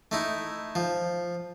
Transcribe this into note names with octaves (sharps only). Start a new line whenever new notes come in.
A3 D#4 E4
F3